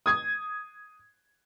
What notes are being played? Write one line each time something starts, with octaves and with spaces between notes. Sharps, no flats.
D#6 G#6